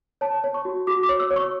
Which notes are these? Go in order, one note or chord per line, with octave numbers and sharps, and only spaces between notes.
C#5 A5
C#5
C#6
F#4
F#4 D6
D6
C#5
E6
C#5
C#6